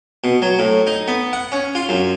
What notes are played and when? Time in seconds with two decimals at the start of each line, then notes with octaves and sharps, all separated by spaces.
0.24 B2
0.42 F#3
0.59 A2
0.87 D#4
1.08 B3
1.33 F#5
1.52 C#4
1.75 F4
1.89 F#2